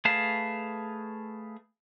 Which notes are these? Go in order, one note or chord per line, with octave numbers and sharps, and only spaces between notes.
A3 G#4 B4 F5 A5